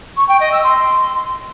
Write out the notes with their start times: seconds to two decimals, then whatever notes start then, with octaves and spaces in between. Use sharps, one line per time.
0.17 C#6
0.29 G5
0.40 D#5
0.52 E6
0.64 C6